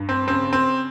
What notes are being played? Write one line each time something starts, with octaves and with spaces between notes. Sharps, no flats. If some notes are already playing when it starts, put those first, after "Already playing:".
Already playing: G2
C4
C#3 C4
C4